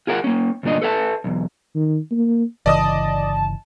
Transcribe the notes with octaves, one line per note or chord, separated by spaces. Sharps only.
F4 G#4 A#4 D5 F#5
A#3 C#4
D2 G2 A#2 D4 D#5
A4 B4 E5 F5 A5
B1 E2
D#3
A#3
G1 C#3 E3 D5 D#5 A5 D#6